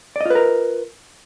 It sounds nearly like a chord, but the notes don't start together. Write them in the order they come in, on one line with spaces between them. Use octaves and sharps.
D5 D#5 F4 B4 A#4